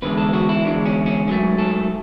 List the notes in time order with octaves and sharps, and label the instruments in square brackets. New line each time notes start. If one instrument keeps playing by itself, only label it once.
[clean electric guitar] E2 D3 G#3 B4
A4
F#4
E4
E2 D3 G#3 D4
C#4
C#4
G#2 F#3 A3 C#4
A4